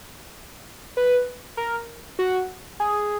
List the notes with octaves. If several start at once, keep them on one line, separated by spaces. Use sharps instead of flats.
B4
A#4
F#4
G#4